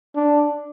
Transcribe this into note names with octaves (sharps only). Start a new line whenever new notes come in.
D4